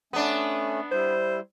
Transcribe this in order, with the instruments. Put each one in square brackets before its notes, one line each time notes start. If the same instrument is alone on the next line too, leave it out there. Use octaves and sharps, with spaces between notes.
[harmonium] A3 C#4 [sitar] B3 D4
[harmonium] G3 E4 [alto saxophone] C5